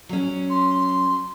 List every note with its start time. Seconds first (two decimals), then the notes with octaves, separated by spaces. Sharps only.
0.09 F#3 C#4
0.50 C6